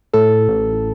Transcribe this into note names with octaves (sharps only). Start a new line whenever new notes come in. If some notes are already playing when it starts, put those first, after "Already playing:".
A2 A4
A1